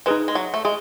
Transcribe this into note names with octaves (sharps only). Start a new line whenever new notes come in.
G#3 D#4 G#4 B4
G#3
F#3
A3
G#3 G#4